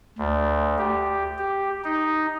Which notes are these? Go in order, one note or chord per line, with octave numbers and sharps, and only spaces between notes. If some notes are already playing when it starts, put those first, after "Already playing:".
D2
G4
G4
D#4